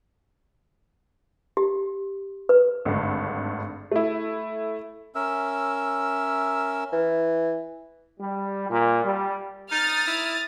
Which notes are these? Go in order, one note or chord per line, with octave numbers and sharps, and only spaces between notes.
G4
B4
G#1 D2 G2
A3 E4
C#4 A#4 E5 E6
E3
G3
A#2
G3
D#4 D#6 F6 A6
E4